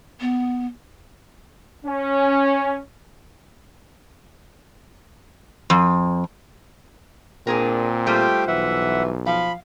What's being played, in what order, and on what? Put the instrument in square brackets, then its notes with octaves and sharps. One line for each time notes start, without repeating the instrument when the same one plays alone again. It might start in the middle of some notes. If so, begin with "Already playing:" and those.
[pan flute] B3
[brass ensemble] C#4
[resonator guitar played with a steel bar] F2
[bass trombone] A#2 [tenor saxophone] C4 [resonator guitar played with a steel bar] D4 G#4 A#4
[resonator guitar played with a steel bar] G3 F4 C5 [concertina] A3 G4 G5
[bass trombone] B1 [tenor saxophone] E3 [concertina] E5 F#5
[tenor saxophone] F3 [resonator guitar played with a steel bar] F5 [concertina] B5